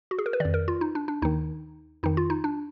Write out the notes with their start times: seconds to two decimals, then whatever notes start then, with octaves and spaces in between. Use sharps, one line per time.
0.11 F#4
0.18 G#4
0.26 A#4
0.33 B4
0.40 F2 D#3 D5
0.54 A#4
0.68 F4
0.81 D#4
0.95 D4
1.08 D4
1.22 D#2 D#3 D#4
2.03 F2 D#3 D#4
2.17 F4
2.30 D#4
2.44 D4